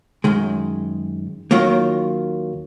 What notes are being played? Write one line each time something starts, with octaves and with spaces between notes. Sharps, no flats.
F#2 D#3 G#3
D#2 D#3 F#3 A#3 F4